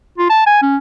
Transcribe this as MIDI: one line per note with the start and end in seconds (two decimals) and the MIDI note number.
0.18 0.30 65
0.30 0.45 81
0.47 0.60 80
0.63 0.77 61